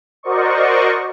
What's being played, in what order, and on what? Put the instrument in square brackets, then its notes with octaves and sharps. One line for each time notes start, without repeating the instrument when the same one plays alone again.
[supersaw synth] F#4 A#4 C5 D5 D#5 C#6